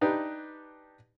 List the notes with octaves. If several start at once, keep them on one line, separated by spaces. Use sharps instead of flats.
D4 D#4 G4 B4